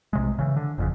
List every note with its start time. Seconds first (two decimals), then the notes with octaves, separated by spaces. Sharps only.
0.13 B1 C3 G#3
0.39 C#3 E3
0.57 D3
0.78 G1 F2 C#3